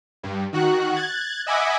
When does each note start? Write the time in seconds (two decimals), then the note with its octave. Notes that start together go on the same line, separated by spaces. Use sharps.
0.23 G2
0.53 D#3 F#4 F#6
0.95 F#6 G#6 A6
1.47 D#5 E5 F#5 G#5 B5 D6